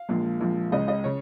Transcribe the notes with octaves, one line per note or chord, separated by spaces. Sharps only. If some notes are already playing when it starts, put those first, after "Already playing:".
Already playing: F5
A#1 A#2 F3 G#3
A#1 A#2 F3 G#3
C#2 C#3 G#3 D#5
D#5
C#3 C#5